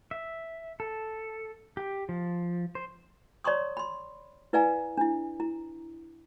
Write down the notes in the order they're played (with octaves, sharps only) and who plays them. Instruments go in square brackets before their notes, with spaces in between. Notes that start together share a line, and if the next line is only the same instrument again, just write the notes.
[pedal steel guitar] E5
A4
G4
F3
C5
[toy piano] C#5 D5 A#5 C6 C#6 D#6
B5 C6
E4 B4 D5 F5 G#5 A#5
D4 E4
E4 A#5